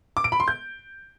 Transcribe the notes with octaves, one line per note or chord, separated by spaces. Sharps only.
D6
D7
B5
C6
G6